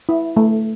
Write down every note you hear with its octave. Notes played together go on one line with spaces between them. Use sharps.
E4
A3